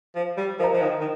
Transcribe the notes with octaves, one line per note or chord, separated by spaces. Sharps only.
F3
G3
F3 A#4 D#5 A#5
F3
D#3
D#3